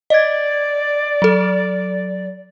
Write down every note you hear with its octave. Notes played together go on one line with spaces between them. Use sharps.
D5 D#5 G#6
F#3 A4